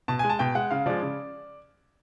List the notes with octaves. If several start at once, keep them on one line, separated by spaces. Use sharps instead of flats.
B2 A5
G#3 G#5
A5
B2 G5
G#3 F#5
C#3 F5
F3 G#3 D5
C#3